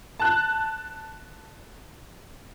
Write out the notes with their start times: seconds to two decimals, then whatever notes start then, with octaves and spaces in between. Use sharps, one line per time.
0.19 A5 F#6